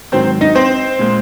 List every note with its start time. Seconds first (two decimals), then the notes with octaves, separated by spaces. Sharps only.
0.12 G#2 D#3 F#3 C4 C5
0.41 D#4 D#5
0.55 C4 C5
0.99 A#2 G#3